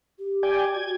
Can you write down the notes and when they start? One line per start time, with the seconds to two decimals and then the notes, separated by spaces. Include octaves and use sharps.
0.19 G4
0.43 D5 G5 G#5
0.75 F#4 G#6